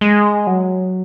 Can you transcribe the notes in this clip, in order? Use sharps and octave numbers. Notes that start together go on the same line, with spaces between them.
G#3
F#3